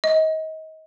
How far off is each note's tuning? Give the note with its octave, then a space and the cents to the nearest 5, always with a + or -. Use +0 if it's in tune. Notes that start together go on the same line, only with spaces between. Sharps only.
D#5 +30